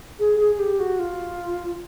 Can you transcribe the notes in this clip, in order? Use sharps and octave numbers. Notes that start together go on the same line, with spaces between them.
G#4
G#4
G4
F#4
F4